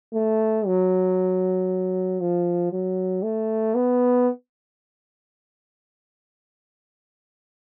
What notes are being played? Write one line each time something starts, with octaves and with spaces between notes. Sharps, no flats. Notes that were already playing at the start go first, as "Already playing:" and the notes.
A3
F#3
F3
F#3
A3
B3